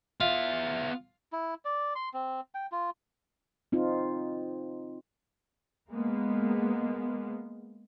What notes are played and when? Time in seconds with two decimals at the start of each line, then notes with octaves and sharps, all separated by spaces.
0.20 B3 F4 E5
1.33 E4
1.65 D5
1.95 C6
2.14 C4
2.55 G5
2.72 F4
3.72 C4 D#4 F4
5.91 G#3 A#3 B3